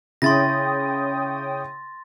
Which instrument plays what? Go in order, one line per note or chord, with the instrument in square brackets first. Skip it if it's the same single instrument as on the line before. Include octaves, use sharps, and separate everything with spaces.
[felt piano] C#3 E4 [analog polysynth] C#5 G5 D#6 [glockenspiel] C6 A6 A#6